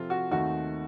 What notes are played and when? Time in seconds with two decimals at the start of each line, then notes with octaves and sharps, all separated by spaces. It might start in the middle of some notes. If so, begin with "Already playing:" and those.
Already playing: C3 F3 C4 F4 A4
0.10 F#4
0.31 D#2 D#3 A3 C4 D#4 F#4